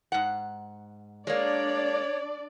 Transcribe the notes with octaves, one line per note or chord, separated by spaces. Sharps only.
G#2 F#5
G#3 A#3 D4 C#5 D5